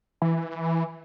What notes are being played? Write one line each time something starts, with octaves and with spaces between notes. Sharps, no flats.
E3